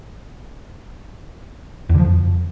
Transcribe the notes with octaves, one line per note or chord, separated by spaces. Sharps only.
E2
D3
F3
F2